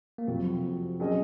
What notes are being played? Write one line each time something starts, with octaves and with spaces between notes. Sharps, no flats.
A#3
F2 C3 F#3 C4
F#3 C4 C#4 G#4 D#5